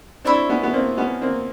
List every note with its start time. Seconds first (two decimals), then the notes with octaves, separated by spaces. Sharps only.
0.25 C4 D4 E4 A4 C#5
0.49 B3 C#4
0.63 B3
0.73 A#3 C4
0.97 B3 C#4
1.22 A#3 C4